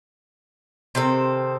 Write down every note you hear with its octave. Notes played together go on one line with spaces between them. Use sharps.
C3 D#3 C4 A4